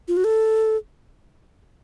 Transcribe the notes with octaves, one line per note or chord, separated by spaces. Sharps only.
F4
F#4
A4